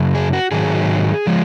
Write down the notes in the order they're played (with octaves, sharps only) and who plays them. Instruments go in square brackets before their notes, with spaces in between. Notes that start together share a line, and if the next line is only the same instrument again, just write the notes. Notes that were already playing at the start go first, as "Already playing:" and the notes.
Already playing: [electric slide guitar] F#2 C#3
G#4
F#4
G#2 D#3 F#3 G#4
F3 G#3